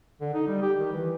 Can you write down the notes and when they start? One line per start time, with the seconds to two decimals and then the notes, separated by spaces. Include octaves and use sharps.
0.21 D3
0.34 D#4
0.47 G3
0.62 G4
0.79 D#3
0.93 E3